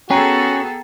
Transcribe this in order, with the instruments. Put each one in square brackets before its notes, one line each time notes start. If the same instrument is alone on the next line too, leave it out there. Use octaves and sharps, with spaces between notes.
[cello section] B3 G#4 A4 [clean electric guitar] C#4 [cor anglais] F#4 [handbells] G5 A#5